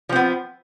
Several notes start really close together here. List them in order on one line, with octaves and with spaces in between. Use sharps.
F3 C4 B3